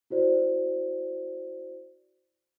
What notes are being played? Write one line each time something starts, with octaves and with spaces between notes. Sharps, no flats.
E4 F#4 C5 D5